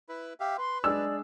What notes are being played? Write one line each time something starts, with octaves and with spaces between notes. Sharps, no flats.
E4 B4
G4 E5 F5
B4 C6
G#3 D4 G#4 D5 E6